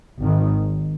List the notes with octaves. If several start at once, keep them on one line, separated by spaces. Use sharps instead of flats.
G#1 G#2 D#3